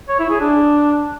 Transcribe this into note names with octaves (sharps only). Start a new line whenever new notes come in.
C#5
E4
G#4
D4